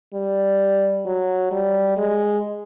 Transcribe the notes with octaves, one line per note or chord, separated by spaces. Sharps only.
G3
F#3
G3
G#3